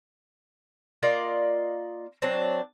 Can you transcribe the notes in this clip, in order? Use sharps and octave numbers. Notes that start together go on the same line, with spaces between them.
A#3 F4 D5 D#5
F#3 C4 D4